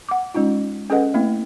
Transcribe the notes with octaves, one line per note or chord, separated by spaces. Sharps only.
F#5 D6
G#3 C#4 D#4 F4
C#4 G#4 A4 B4 D#5 F#5
A3 A#3 C4 E4